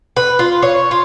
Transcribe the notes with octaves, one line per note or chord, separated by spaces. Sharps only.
B4
F4
C#5
F4